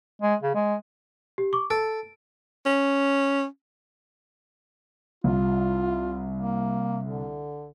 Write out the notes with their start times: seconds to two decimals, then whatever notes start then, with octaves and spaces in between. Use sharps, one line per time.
0.22 G#3
0.43 C#3
0.55 G#3
1.38 G4
1.53 C#6 D6
1.70 A4 D7
2.66 C#4
5.24 C2 F4
6.37 A#3
7.04 D3